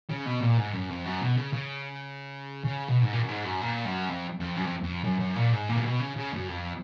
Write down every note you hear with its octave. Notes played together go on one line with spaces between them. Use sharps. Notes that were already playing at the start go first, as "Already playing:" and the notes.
C#3
B2
A#2
G#2
F#2
F2
F#2
B2
C#3
C#3
C#3
B2
G#2
A#2
F#2
G#2
F#2
A#2
F#2
F2
F2
F#2
F2
F2
F#2
F#2
A#2
G#2
A#2
C#3
B2
C#3
C#3
F#2
F2